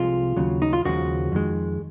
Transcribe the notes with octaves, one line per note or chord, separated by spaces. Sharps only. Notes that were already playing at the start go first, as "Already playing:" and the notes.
Already playing: C2 C3 F3 G#3 F4
D#2 C#3 F#3
D#4
F4
D#2 C#3 F3 G#3 F#4
F2 D#3 G#3